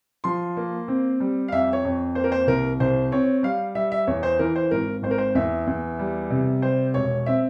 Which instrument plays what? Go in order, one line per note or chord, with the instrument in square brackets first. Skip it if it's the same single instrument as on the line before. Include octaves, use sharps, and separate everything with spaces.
[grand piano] F3 C6
A#3
C4
G3
F5
F2 E5
C#5
F2
A#3 C5
A#4
C5
C2 A#4
C2 C5
C4 C#5
G3 F5
G3 E5
E5
E2 C#5
C5
E3 A#4
C5
G#1 A#4
G#1 C5
A#4
C5
E2 E5
E2
G3
C3
G3 C5
E1 C#5
C4 E5